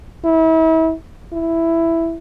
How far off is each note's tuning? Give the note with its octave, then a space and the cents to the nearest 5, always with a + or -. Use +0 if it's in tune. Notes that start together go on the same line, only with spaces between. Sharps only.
E4 -35
E4 +5